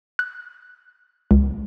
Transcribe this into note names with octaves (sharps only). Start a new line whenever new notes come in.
F#6
C#2